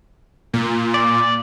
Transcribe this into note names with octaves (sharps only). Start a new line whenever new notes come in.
A#2
D5